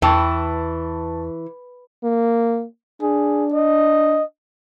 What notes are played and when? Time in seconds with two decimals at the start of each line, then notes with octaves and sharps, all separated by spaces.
0.02 E2 E3 G5 A5 C#6
2.04 A#3
3.02 D4 G#4
3.53 D#5